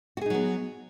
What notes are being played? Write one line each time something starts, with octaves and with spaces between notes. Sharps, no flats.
F#3 B3 D#4 F#4 G#4